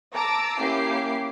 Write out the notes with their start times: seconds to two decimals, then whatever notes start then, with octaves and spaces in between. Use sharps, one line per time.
0.13 A5 A#5 D6 E6 D7
0.59 A#3 C#4 E4 G4 D6 C7